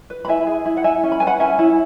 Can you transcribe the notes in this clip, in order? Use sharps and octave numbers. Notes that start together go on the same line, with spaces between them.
B4
B5
E4 E5 G#5
G#4
E4
F#5
E4 E5 G#5
C#4
B5
B4 G#5
F#5 B5
C#4 E5 G#5
E4